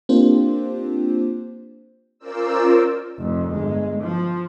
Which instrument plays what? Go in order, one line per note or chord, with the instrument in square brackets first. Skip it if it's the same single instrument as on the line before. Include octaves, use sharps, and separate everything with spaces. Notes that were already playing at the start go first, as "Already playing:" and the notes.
[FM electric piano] A#3 C4 D4 F4 G4 C5
[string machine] C#4 F4 A#4 C5 D5 E6
[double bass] F1 F2
G1 G#3
F3